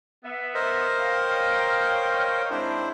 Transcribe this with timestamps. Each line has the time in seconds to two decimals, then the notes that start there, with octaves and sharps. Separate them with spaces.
0.24 B3 E5
0.54 A#4 C5 D#5
0.98 C#5 F5 G5
2.50 G#2 C4 D4 E4 C5